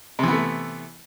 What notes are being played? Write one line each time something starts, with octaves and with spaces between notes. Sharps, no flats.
C3 E3 A3 B3